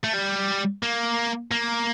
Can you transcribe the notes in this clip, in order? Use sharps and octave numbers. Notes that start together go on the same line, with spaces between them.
A3
G3
A#3
A#3